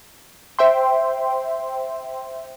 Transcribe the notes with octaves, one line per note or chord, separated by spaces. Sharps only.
C5 E5 G5 C6